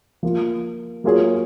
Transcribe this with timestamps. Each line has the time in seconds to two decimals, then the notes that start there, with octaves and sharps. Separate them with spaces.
0.23 F3 A#3 F4
1.04 F#3 A#3 F4 G#4 C#5